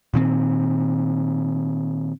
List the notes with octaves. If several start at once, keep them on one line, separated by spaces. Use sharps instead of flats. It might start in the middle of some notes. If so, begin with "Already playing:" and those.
A#2 D#3 C4